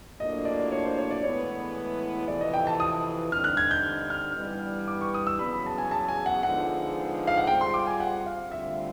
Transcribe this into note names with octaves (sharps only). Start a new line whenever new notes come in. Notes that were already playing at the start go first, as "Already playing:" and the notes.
A2 F#3 A#3 D4 F4 D#5
D5
C#5
C5
C#5
D5
A2 E3 G#3 B3 C#5
F2 C3 E3 D5
D#5
G5
A5
D#6
G2 D3 G3 C4 D#4 F6
F#6
G#6
G6
F6
G2 E3 G3 B3
D6
C#6
D#6
E6
E2 C#3 F#3 B3 B5
B5
A5
G#5
A5
G#5
F#5
D3 F3 G#3 B3 D#4 F#5
F5
F#5
G3 C4 F4 G#4 C5 G5
C6
D6
G#5
F#5
F5
D2 D3 G3 C4 F4 E5